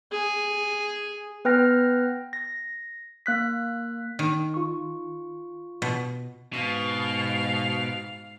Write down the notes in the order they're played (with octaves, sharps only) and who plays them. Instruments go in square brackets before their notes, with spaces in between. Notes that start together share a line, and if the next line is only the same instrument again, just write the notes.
[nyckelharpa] G#4
[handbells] B3 B4 G5 F6 A#6
A#6
A#3 F#6 B6
[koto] D#3
[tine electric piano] F4 C#6
[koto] B2
[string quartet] G#2 F5 [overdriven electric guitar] B2